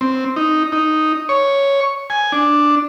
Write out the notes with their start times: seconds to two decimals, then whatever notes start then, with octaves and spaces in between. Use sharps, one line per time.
0.01 C4
0.36 D#4
0.72 D#4
1.29 C#5
2.10 G#5
2.32 D4